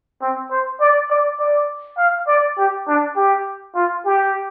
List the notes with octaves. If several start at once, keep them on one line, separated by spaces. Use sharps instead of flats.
C4
C5
D5
D5
D5
F5
D5
G4
D4
G4
F4
G4